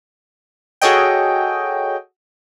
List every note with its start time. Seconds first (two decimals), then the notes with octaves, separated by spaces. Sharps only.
0.82 F#4 G#4 A4 C#5 D#5 G5